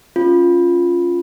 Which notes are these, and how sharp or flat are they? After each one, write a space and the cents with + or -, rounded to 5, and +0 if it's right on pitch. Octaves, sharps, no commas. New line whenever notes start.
C#4 +0 F4 +0